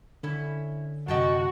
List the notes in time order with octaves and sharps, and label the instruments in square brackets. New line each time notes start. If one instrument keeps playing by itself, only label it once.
[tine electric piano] D3 [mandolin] C#4 E4
[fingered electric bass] F#2 C3 [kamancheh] F#4 [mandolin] D#5 G5 A5